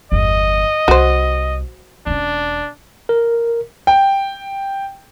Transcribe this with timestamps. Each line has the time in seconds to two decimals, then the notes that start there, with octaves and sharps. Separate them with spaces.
0.12 G1 E2 D#5
0.88 C2 F#4 C5
2.07 E1 C#4 D4
3.09 A#4
3.87 G5